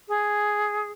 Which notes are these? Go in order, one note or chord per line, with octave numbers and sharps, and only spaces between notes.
G#4